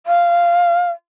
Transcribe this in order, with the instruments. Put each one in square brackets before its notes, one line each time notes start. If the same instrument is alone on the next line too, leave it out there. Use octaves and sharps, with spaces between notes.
[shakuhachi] F5